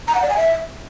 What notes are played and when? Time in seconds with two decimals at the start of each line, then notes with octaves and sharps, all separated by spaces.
0.08 A#5
0.15 F#5
0.22 D5
0.29 G#5
0.37 E5